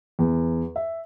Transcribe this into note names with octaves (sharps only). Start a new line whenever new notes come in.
E2
E5